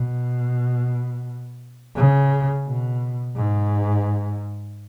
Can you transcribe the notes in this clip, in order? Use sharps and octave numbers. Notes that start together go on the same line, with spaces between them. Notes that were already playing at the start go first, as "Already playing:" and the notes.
Already playing: B2
C#3
B2
G#2